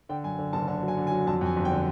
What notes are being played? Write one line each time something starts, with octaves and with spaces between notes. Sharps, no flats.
D3 G5
F#2 G#5
D3
F#1 A5
D3 A5
F#3
G#5
D3
G#5
F#3
F2 A5
F2 G#5
G1
G5
D3